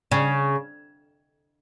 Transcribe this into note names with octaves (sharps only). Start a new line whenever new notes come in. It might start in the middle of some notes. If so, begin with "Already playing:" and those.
C#3